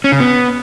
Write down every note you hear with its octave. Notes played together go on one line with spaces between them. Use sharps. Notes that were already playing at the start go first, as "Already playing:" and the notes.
C#4
C#3
B3